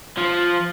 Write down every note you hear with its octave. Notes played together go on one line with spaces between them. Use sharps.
F3